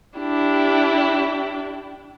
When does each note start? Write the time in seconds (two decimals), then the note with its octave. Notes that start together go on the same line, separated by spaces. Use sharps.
0.18 D4 E4 G4